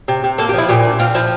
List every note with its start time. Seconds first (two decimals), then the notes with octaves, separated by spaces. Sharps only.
0.08 C3
0.24 C3
0.38 A#3 A4
0.49 G4
0.53 F3 E4
0.69 A#2 G4
0.84 D4
0.99 C4 F4
1.15 F3 E4